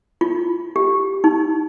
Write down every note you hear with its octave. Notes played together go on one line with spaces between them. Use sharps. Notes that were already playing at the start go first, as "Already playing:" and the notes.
F4
G4
D#4